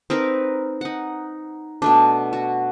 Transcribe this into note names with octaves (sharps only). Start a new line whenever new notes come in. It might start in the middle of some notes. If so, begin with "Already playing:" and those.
C4 D#4 A#4 B4
D#4 F#5
B2 A3 D4
F#4